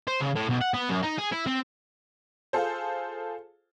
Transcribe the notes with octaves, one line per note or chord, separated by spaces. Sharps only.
C5
C#3
A2
B1
F#5
B3
F#2
D#4
G#4
E4
C4
F4 G#4 A4 C5